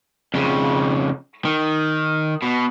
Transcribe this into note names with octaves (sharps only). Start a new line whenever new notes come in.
F2 C#3
D#3
B2